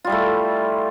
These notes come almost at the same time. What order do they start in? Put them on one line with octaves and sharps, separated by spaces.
F4 G3 E4 A3